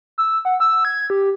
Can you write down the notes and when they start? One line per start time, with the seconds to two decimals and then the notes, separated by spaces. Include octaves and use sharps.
0.18 E6
0.45 F#5
0.60 E6
0.85 G#6
1.10 G4